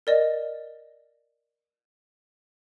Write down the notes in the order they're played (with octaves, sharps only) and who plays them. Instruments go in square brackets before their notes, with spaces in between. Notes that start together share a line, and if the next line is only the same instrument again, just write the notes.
[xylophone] A#4 D5 D#5